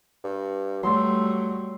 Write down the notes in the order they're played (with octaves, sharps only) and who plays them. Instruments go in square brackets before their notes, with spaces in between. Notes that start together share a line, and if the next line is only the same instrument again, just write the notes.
[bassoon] G2
[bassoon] F#3 [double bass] G3 A3 [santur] C6 E6